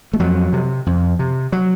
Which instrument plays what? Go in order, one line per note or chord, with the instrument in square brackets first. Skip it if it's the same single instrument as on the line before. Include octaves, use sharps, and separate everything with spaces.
[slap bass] A3
F2 F#3
C3
F2
C3
F#3